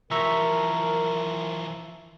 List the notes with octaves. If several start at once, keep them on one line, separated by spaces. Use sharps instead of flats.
E3 F3 A#4 E5 A#5 C#6